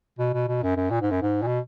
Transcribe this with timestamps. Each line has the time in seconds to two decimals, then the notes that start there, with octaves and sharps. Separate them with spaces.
0.19 B2
0.33 B2
0.48 B2
0.63 F#2
0.76 F#2
0.90 A#2
1.01 G#2
1.11 F#2
1.22 G#2
1.42 A#2
1.47 B2